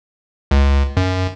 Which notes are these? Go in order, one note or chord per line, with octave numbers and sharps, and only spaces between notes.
C#2
F#2